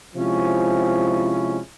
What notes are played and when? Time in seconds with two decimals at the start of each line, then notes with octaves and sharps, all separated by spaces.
0.15 C3 F3 G#3 C#4 E4